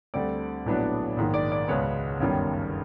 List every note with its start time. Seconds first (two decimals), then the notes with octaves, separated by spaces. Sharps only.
0.14 D2 D3 G3 C4 D5
0.66 A#1 A2 F#3 B3 D4
1.17 A#1 G#2 D#3
1.34 D5
1.52 D5
1.68 C#2 B2 G#3 B3 C#5
2.20 G1 F#2 D#3 G3